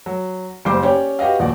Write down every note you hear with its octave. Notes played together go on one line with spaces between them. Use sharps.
F#3
F#1 G3 C5 D6
C#4 G4 C#5 D5
F#4 G4 B4 D#5 F5
D#1 A#1 F#4 D5